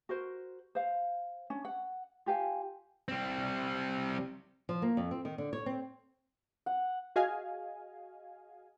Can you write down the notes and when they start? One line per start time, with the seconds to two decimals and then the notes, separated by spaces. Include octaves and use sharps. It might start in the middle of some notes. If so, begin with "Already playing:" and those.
0.09 F#4 A#4 C5
0.75 C5 F5
1.50 C#4 D4
1.65 F#5
2.26 F4 G4 F5 G#5
3.08 G3 C4
4.69 F3
4.82 A#3
4.97 F2
5.11 C4
5.25 D#3
5.38 D3
5.53 C#5
5.66 C4
6.66 F#5
7.16 F#4 G#4 D#5 F5 G#5